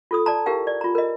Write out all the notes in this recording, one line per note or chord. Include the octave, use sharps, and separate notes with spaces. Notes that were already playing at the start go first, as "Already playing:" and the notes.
F4 A4 D#6
D5 A5 A#5
E4 G4 A#4 F5 G5
D5
F4 A#5
A#4 D#5